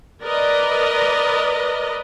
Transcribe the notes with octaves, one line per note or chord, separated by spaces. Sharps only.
A#4 B4 D5 D#5